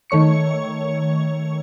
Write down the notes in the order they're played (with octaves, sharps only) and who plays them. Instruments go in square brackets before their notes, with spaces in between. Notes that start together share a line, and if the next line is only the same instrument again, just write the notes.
[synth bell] D#3 A3 C#5 C#6 C#7